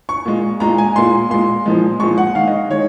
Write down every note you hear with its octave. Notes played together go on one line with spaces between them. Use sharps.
C#6
A#2 G#3
A#2 G#3 A#5
G#5
A#2 G#3 C6
A#2 G#3 C6
A#2 F3 G#3
A#2 F3 G#3 C#6
F#5
D#3 G#3 F5
D#5
D#3 G#3 C#5